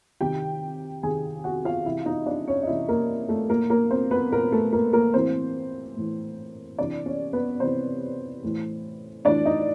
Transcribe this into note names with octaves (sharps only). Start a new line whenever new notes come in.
C3 D#3 G4 G5
C3 D#3 G#4 G#5
F#4 F#5
F4 F5
C3 E3 E4 E5
D#4 D#5
D4 D5
C#4 C#5
D#5
C3 E3 E4 E5
A#3 A#4
A3 A4
A#2 A#3 A#4
A#3 A#4
C4 C5
B3 B4
A#2 A#3 A#4
A3 A4
A#3 A#4
A#3 A#4
A2 E3 C4 C5
A2 E3
C3 E3 D4 D5
C#4 C#5
B3 B4
C3 E3 C4 C5
A2 E3
A2 E3 D4 D5
D#4 D#5